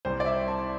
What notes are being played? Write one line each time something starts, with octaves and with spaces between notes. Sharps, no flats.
C2 C3 G3 C5
D5
E5
A5